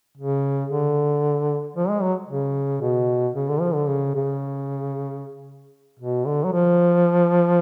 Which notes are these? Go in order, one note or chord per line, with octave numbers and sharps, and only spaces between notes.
C#3
D3
F3
G#3
F#3
C#3
B2
C#3
D3
F3
D3
C#3
C#3
B2
D3
F#3
F3